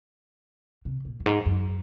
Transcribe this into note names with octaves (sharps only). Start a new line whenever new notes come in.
C3
A#2
F#2
G#2
F#2